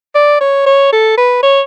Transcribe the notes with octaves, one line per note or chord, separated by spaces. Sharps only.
D5
C#5
C#5
A4
B4
C#5